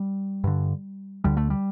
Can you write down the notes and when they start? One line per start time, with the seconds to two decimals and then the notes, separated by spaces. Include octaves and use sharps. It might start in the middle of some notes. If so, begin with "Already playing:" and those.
Already playing: G3
0.44 G2 D3
1.24 D2 D3 G3
1.37 A3
1.50 G3